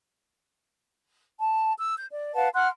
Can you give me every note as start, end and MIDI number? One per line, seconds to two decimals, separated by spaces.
1.39 1.71 81
1.78 1.93 88
1.97 2.05 91
2.10 2.30 74
2.35 2.48 71
2.35 2.48 77
2.35 2.48 78
2.35 2.48 81
2.53 2.68 78
2.53 2.68 84
2.53 2.68 89
2.53 2.68 90